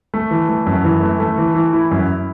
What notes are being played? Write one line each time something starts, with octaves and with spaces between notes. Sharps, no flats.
A3
E3
A3
F#2
E3
A3
A3
E3
E3
E4
F#2